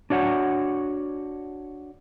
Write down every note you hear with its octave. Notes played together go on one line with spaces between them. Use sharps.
D4 F#4 C#5 F#5